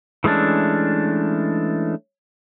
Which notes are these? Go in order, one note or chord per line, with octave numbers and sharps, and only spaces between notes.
E3 G#3 A3 C#4 D4